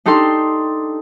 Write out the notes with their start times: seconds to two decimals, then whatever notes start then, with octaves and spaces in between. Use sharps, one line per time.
0.06 D4 D#4 G4 A4 C6